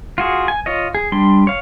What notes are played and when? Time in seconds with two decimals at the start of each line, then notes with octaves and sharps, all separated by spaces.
0.18 F4 F#4 G#4
0.48 G#5
0.66 F4 C#5 D#5
0.95 G#4
1.12 G3 D4 C6
1.47 C#5 F5